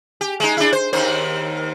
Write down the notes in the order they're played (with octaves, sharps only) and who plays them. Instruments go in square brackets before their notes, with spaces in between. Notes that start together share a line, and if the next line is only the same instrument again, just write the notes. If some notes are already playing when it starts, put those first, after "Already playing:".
[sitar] G4
G#3 D#4
D4 E4
C5
D#2 D#3 C5